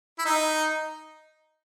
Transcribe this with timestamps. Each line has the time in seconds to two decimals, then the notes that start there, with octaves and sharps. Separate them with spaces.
0.19 E4
0.25 D#4